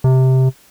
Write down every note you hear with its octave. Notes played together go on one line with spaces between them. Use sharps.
C3